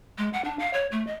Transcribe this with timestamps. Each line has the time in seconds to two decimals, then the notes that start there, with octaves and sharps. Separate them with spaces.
0.18 G#3
0.33 F#5
0.44 D4
0.59 F5
0.73 C#5
0.92 A3
1.07 D#5